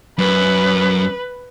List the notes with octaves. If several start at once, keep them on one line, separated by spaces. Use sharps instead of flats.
F#2 B4